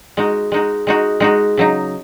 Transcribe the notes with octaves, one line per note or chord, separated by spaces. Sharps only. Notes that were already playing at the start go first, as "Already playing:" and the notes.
G#3 D#4 F#4
G#3 D#4 F#4
G#3 D#4 F#4
G#3 D#4 F#4
C#3 F#3 D#4